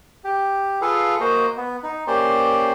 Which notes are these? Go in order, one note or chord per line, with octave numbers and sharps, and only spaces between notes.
G4
F4 G#4 A4 B4 F5
A#3 F#4 C5 D#5
B3
D#4
A#3 C#4 G4 C5 D5 C6